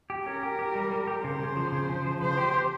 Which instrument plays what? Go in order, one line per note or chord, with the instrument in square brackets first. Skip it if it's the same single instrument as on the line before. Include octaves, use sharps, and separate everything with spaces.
[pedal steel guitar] G4
[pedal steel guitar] C#4 [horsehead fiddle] A#4
[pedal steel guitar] G4
G4
G3
G3
G4
[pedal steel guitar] C#3 [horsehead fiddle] C5
[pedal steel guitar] C#3
F3
C#3
C#3
F3
[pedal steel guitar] F3 [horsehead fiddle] C5
[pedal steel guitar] G4
G4